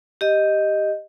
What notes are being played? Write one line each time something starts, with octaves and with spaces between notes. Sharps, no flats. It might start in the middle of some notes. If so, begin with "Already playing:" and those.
G4 D#5